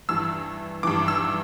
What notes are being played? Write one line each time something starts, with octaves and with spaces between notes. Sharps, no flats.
G2 E3 E6
G2 E3 D6
E6